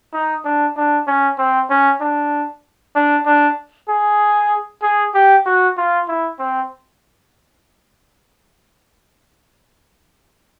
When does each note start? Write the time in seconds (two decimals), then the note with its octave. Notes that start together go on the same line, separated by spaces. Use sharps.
0.13 D#4
0.45 D4
0.76 D4
1.07 C#4
1.38 C4
1.70 C#4
2.00 D4
2.95 D4
3.26 D4
3.89 G#4
4.83 G#4
5.14 G4
5.46 F#4
5.77 F4
6.08 E4
6.39 C4